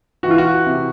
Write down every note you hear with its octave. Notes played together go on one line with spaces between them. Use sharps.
E3 F#4
F4
F#4
C3